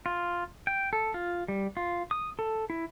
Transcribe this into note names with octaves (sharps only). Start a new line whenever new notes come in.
F4
G5
A4
F4
G3
F4
D#6
A4
E4